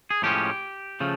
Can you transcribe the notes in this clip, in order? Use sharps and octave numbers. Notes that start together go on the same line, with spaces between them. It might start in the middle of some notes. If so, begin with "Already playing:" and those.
G#4
A2 F3 G#3 C#4 G4
C#3 F3 A3